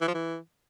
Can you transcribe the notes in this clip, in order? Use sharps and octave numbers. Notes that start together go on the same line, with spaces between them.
E3
F3
E3